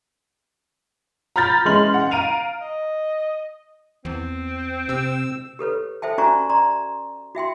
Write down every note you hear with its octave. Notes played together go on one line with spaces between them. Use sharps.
A#5 B5 F6 G6 A6 A#6
E3 G#3 C#4 C6 F6 F#7
F#5
F5 A#5 D7 D#7 F7
D#5
E2 C4
C3 E6
G4 A4 B4 C#5
A4 C5 E5 G5 A5
C#4 F#4 D5 G#5 A#5 C#6
D5 A#5 C6
F#4 E5 G5 C6